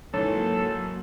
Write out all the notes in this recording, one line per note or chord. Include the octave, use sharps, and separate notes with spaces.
G#2 C#3 E3 F#3 A#3 A4 C#5